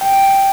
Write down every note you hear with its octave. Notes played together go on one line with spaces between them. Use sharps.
G5